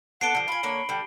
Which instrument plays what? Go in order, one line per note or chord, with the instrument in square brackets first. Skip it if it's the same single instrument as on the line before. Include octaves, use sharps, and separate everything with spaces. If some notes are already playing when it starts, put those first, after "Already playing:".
[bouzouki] B3 D4 A4 [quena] F#5 [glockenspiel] C7 D7 G7
[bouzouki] D3 F3
[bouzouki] F4 G#5 [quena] B5
[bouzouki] D3 A#3 C#5
D3 G3